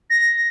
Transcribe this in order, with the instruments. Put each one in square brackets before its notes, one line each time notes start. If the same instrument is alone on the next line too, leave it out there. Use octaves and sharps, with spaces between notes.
[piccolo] A#6